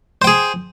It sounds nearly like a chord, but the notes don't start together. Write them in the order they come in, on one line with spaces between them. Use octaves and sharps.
C5 G5 G#4